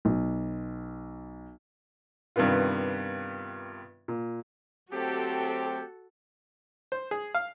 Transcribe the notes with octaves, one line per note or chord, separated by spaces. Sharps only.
B1
G2 C3 D#3 B3 F4
A#2
F#3 A3 C4 F#4 G4 A4
C5
G#4
F5